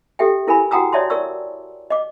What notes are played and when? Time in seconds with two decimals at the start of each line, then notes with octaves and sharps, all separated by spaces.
0.19 G4 A4 E5 G5
0.47 E4 A#4 G#5 B5
0.71 F#4 F#5 G5 A#5 D#6 E6
0.93 C#5 D5 E5 A5 C6
1.10 A#4 D5 C#6 E6
1.90 D#5 D6